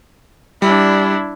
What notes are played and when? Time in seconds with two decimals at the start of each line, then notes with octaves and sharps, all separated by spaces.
0.62 G3 D4 E4